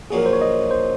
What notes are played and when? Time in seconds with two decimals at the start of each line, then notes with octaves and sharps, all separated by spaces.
0.10 A#1 A#2 F#3 G#4
0.18 A#4
0.26 C5
0.33 C#5
0.41 D#5
0.71 C5